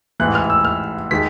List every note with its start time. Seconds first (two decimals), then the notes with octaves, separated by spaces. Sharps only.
0.20 A1 G#2 E3 F#6
0.35 F6
0.50 E6
0.65 F6
1.11 D#3 G#3 B6